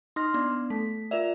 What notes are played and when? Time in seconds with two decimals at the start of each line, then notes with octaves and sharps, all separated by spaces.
0.16 D#4 C6 F6 A#6
0.34 B3 D4
0.70 A3 B6
1.11 F4 A#4 D5 E5 F7